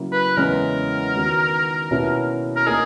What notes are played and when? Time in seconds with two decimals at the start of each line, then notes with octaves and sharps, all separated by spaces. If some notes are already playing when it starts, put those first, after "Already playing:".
Already playing: C#3 F#3 A#3 E4
0.12 B4
0.37 E2 C#3 E3 G#3 A#4
1.13 D#3 G#3 B3 F#4
1.91 B2 A#3 C#4 E4
2.56 A#4
2.66 A#3 D#4 G#4